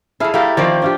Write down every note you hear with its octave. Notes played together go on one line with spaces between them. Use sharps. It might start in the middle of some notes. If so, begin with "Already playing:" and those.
F2 E4 G#4 A4 F5
A3 E4 G4 A#4 F5
D#3 F3 A#3 C4 D5
D4 F4 G4